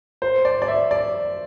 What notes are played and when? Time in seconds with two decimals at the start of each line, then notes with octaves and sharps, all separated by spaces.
0.22 C5
0.45 D5
0.62 D5
0.68 E5
0.91 D5